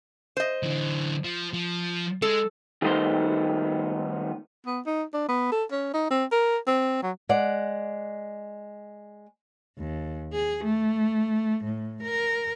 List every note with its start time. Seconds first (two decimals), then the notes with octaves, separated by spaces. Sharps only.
0.37 C5 D#5
0.63 D3 E3
1.24 F3
1.53 F3
2.22 G#3 A4
2.82 D#3 G3 A3 B3 D#4 C5
4.67 B3
4.86 D#4
5.14 D4
5.29 B3
5.52 A4
5.72 C#4
5.94 D#4
6.11 C4
6.32 A#4
6.67 C4
7.03 F#3
7.29 G#3 D5 F#5
9.78 D#2
10.33 G#4
10.64 A3
11.64 A2
12.03 A#4